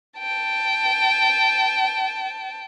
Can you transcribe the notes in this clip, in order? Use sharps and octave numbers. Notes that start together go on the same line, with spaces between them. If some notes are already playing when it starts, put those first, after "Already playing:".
G5 A5